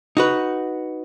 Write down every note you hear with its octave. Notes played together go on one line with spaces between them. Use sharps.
D#4 F#4 B4